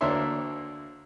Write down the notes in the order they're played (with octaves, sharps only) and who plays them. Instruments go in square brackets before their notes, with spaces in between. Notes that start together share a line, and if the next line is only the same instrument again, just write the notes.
[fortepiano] D2 A#3 D4 C#5 E5 C6